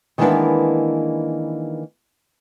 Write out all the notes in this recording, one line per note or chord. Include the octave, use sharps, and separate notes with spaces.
D#3 E3 G#3 A#3 B3 D4